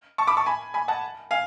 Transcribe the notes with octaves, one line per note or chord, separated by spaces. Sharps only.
A5 C#6
B5 D6
A5 C#6
G#5 B5
G#5 B5
F#5 A5
F5 G#5